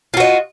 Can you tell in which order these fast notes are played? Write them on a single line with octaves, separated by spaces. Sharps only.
F4 F#4 D#5